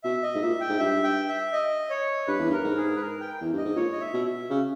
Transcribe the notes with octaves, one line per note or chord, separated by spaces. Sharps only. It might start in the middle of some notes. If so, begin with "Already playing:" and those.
B2 E5
D#5
G#2
A#2 E5
G5
G#2
G2 E5
G5
E5
D#5
C#5
G2 B4
E2
G2
A#4
G#2
G#4
B4
A#4
G5
E2
G2 D#5
G#2
A#2 C#5
D#5
E5
B2
E5
C#3